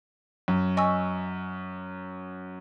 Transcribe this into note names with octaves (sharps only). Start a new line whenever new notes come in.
F#2
D#5 G#5 C#6 E6